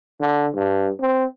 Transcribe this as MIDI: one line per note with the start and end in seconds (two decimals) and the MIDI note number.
0.20 0.48 50
0.55 0.89 43
1.00 1.25 60